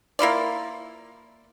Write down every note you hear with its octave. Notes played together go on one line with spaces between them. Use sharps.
A#3 E4 F4 D5